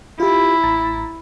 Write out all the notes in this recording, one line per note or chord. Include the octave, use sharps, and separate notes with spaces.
E4 F4 G4
A1 A#5 A6